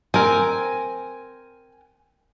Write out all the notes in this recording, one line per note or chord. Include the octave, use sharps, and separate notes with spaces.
C4 A#4 G#5